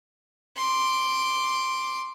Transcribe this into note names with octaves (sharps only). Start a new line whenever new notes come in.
C6 D6